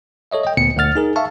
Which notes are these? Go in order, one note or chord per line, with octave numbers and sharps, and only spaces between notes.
A4 C#5 D#5 E5
D#5 G5
G#1 D2 A#2 B3 C#7
D2 D3 F#5 F6 A6
D#4 G#4 A#4
E5 F5 A5 C#6